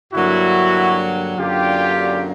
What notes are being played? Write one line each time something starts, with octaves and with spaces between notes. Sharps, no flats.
G2 D3 F#3 A#3 E4 F#4
F#2 D3 F#3 A#3 D4 F4 G4